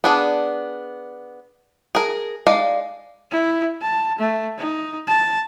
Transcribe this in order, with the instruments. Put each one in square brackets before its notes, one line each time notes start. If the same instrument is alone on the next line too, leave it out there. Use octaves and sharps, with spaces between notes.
[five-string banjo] B3 D4 G#4
G#4 A#4
G#3 D#4 D5 F5
[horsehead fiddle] E4
A5
A3
D#4
A5